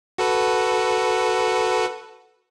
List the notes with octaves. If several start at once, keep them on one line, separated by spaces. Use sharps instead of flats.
F#4 A4 B4